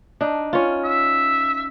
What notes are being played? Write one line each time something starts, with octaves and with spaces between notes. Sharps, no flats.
D4 D#4
C#4 F4
E5